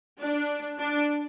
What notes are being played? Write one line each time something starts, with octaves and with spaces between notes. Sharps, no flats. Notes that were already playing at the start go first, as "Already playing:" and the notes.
D4
D4